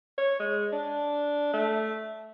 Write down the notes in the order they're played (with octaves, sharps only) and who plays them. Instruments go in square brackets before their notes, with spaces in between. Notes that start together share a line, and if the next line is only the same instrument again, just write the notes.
[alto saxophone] C#5
G#3
D4
A3